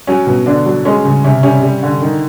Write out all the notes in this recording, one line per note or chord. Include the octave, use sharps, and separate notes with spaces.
F#3 C#4
B2
D3 D4
F#3
G#3 C#4
C#3
C3 C#4
G3 C#4
G3
D3
D#3